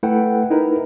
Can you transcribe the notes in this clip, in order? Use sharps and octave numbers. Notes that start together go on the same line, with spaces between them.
A3 E4 A4 B4 F#5 G5
D#4 E4 A#4 B4